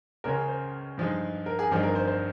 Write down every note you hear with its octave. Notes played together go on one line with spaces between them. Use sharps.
C#2 C#3 G#3 C#4 A#4
G#4
C5
G2 F3 G#3 D#4
A#4
G#4
G1 G2 F3 C4 D#4 G#4
A#4
C5
C5